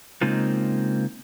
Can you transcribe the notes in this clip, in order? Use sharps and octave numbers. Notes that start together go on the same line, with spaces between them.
C#3 G#3 A#3 C4 D#4 F4